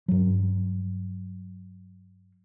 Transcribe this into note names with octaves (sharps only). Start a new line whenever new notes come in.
G2 F#3